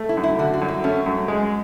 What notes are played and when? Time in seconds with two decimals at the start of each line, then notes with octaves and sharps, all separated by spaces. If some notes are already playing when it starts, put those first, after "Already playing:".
Already playing: A3
0.09 E4
0.17 F#2
0.23 E4
0.38 D3 F#4
0.54 F#4
0.62 F#2
0.68 E4
0.84 A3 C#4
1.06 F#2
1.28 G#3